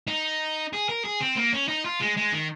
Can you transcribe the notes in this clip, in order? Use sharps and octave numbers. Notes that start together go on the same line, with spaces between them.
D#4
G#4
A#4
G#4
C4
A#3
C#4
D#4
F4
G#3
G#3
D#3